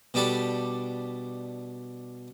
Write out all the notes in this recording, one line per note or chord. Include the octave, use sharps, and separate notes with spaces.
B2 G3 D4 G4 A4